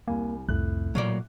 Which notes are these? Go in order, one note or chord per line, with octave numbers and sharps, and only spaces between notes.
C2 A#3 G#5
C2 F2 A2 F#6
A#2 F#3 A#3 D5